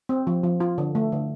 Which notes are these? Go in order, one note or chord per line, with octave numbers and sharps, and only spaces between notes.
C4
F3
F3
F4
D3
A3
D3